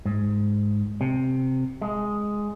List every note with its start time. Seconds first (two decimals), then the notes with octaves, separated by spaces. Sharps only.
0.05 G#2
1.01 C3
1.81 G#3